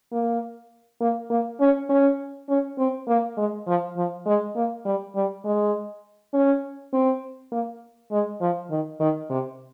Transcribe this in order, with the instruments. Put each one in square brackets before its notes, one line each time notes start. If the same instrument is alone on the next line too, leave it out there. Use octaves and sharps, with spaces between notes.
[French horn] A#3
A#3
A#3
C#4
C#4
C#4
C4
A#3
G#3
F3
F3
G#3
A#3
G3
G3
G#3
C#4
C4
A#3
G#3
F3
D#3
D#3
C3